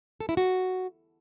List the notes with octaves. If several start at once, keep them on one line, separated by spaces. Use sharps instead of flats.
A4
E4
F#4